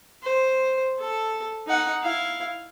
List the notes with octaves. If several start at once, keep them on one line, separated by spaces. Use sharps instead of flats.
C5
A4
D#4 F#5
E4 F5